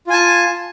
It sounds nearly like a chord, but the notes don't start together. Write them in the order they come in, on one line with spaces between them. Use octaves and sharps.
F4 G#5 A5